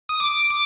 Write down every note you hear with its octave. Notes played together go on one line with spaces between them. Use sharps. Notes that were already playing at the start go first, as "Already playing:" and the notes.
D#6
D6
D6